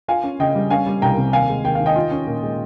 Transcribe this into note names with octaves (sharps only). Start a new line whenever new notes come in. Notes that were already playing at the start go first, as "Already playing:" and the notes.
F4 F5 G#5
C#4
C#3 D#5 G5
G3
C#4 F5 G#5
G3
C2 G5 A#5
C3
D#2 F5 G#5
G#3
D#2 G5
D#3 F5
D#5 G5
F4
C#4
A#2
G#3